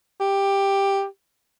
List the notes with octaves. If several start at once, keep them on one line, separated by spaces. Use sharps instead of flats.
G4